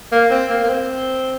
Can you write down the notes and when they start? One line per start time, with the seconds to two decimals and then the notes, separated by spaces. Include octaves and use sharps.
0.12 A#3
0.31 C4
0.50 A#3
0.63 A#3
0.69 C4